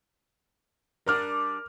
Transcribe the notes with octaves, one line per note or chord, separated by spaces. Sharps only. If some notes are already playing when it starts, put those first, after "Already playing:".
G3 D4 A#4 D6 F6